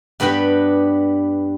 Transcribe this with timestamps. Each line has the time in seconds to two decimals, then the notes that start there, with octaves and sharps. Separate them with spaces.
0.20 G2 B3 D4 G4 B4